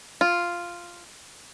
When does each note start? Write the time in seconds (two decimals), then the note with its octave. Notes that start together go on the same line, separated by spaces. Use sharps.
0.21 F4